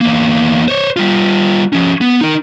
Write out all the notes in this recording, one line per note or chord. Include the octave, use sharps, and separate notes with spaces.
E2 A#3
C5 C#5
G3 F4
F3 C#4
B3
D#4 A#4